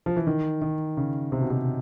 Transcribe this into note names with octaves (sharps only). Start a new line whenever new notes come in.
F3
E3
D#3
D#3
C#3
C3
B2
C3